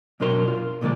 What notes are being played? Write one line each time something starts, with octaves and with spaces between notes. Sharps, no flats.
F#2 B2 D4 A#4 C#5 C6
F4
B1 A#2 D3 F#3 G#3 D5